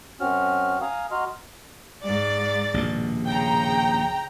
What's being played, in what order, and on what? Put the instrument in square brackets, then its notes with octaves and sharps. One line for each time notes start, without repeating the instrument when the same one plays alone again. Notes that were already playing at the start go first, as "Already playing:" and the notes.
[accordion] F#2 C4 C#4 F#4 F6
F5 G#5 A#5 D#6
F#4 D#5 A#5 C6 F6
[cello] G#2 D5 [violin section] A6
[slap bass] A#1 D#2 B2
[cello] C#3 [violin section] G5 A#5